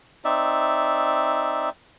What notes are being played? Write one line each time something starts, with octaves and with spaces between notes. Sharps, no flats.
C4 D#4 D5 E5